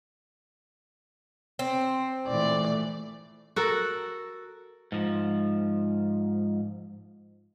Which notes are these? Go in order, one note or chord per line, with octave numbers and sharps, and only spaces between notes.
C4
A#2 E3 A3 D5
F#4 A4 A#4
G#2 F3